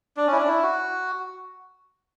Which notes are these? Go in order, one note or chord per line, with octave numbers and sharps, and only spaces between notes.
D4
C#4 E4
D4
E4
F#4